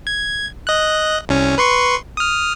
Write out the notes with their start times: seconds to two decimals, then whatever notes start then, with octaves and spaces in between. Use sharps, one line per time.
0.07 G#6
0.67 D#5 F#6
1.29 C2 C#4
1.58 B4 C6 C#6
2.17 D#6 F6